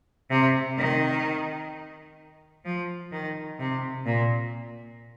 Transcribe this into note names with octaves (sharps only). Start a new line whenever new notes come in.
C3
D#3
F3
D#3
C3
A#2